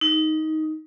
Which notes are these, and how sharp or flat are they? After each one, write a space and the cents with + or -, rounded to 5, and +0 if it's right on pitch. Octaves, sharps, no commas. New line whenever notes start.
D#4 +10